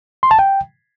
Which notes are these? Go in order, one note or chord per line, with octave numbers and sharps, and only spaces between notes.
C6
A5
G5